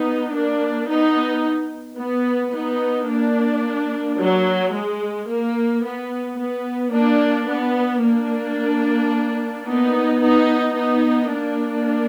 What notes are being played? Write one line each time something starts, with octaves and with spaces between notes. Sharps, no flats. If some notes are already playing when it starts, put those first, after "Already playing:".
Already playing: B3 D#4
A#3 D4
B3 D#4
B3
B3 D#4
A#3 D4
F#3
G#3
A#3
B3
B3
A#3 D4
B3
A#3 D4
B3 D#4
B3 D#4
B3 D#4
A#3 D4